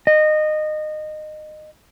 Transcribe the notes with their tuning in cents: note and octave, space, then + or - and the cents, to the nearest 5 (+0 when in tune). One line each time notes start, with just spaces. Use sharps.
D#5 -20